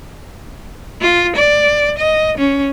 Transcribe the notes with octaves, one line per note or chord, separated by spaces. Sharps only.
F4
D5
D#5
C#4